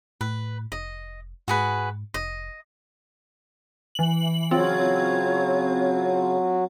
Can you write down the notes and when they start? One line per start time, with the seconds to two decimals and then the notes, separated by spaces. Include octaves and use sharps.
0.21 A2 B4
0.72 F1 D#5
1.48 G#2 F#4 G#4 B4
2.14 F1 D#5
3.95 E3 F#7
4.51 C#3 F#3 C4 F4 C#5